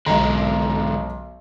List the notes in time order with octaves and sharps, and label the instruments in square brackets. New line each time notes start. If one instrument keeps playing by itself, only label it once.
[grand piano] B1 D#5 A#5 [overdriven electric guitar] G#2 D3